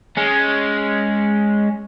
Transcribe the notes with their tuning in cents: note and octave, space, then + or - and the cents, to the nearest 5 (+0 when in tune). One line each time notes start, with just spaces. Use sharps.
G#3 +0 C#4 +0